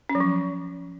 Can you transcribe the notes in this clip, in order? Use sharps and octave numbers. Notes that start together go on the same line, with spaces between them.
C#4
F#3
F3